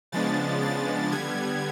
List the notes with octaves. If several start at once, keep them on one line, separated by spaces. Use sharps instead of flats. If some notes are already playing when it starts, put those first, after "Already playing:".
C#3 F3 G#3 B3 D4 A6
A6
D3 G3 B3 G#6